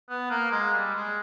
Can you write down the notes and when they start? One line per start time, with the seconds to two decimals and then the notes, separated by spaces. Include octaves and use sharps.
0.09 B3
0.30 A#3
0.52 G#3
0.73 G3
0.95 G#3